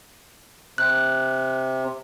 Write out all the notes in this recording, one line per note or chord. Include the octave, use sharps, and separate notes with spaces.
C3 F#6